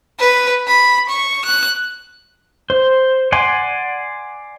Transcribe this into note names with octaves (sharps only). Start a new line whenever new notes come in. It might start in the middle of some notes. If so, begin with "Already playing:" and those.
B4
B5
C#6
F#6
C5
D5 F#5 G#5 C6